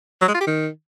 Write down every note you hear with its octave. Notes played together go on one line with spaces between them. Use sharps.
F#3
G#3
F4
G4
D#3